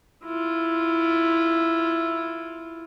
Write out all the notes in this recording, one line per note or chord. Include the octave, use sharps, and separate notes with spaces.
E4 F4